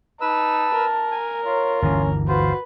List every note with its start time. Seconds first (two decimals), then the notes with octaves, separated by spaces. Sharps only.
0.21 D#4 B4 A5 E6
0.74 A#4
1.11 G#5
1.45 F4 C#5
1.82 G1 D2 E3 C#4
2.28 F4 F#4 B4 C5